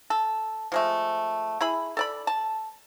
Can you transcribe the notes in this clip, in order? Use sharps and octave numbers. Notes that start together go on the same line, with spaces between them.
A4
F3 G#3 A3
E4 G#4 B5
A4 D5 B5
A5